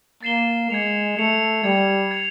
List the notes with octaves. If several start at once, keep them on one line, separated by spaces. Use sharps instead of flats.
A#3 A6 C7 E7 G7
G#3 G#6 C#7 F7
A3 G#6 C#7 F7
G3 G#6 C#7 F7
G#6 C#7 F7